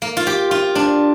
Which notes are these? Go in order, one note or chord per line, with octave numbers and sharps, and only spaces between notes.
A#3
F4
G4
F4
D4